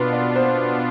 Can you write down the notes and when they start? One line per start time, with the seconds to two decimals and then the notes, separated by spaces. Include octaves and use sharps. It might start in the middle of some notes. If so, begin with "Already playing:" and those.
Already playing: B2 B3 D4 F4 B4
0.13 D5
0.36 C5